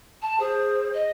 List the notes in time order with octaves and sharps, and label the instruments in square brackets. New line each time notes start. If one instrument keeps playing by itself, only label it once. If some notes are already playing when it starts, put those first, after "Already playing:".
[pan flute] A5
[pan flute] G#4 [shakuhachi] C5
[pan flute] D#5